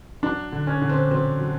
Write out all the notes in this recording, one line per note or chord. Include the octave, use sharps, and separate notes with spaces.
F#3 D4
D3
C#4
D3
C4
F#3 C4
F#3